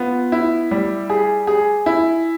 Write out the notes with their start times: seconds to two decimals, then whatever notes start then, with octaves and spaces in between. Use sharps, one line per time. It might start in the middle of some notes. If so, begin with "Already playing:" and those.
Already playing: B3 F4
0.32 E4
0.71 G3
1.10 G#4
1.47 G#4
1.86 E4